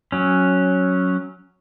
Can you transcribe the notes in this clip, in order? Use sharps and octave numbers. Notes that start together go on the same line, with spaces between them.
F#3 C#4